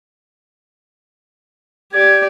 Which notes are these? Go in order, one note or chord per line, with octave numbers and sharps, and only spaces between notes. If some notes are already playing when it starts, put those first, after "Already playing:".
G4 D5 G#6